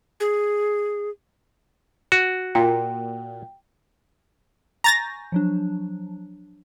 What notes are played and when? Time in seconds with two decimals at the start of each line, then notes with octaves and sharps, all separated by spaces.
0.20 G#4
2.12 F#4
2.55 A#2 G5
4.84 G#5 A#5 C#6 G6 A6 A#6
5.32 F3 F#3 D4